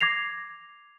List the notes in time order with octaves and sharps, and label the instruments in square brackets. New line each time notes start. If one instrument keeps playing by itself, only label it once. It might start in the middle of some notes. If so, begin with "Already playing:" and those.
[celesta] D6 G#6 A#6 C7 F7